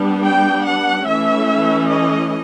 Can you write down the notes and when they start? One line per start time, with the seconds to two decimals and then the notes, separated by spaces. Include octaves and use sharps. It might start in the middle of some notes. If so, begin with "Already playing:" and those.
Already playing: G3 B3 D4
0.23 G5
0.65 F#5
1.06 E3 A3 C#4 E5
1.89 D#5